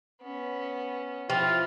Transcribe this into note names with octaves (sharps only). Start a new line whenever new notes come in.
B3 C#4
F3 E4 F4 G5